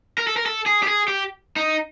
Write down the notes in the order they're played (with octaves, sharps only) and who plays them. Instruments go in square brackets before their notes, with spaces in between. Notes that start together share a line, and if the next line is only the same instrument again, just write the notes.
[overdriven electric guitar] A#4
A4
A#4
A4
G#4
G4
G#4
G4
D#4